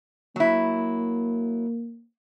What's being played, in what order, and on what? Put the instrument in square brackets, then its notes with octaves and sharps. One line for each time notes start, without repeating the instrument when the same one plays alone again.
[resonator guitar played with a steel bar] F#3 E4 [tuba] A#3